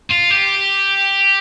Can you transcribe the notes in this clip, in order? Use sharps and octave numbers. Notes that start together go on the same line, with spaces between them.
F4
G4